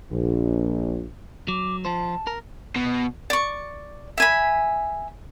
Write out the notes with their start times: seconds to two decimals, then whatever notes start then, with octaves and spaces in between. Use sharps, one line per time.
0.12 A#1
1.48 F#3 D6
1.85 F3 F4 C5 A5
2.27 A#4
2.76 B2
3.30 D5 C#6
4.18 E5 G#5 B5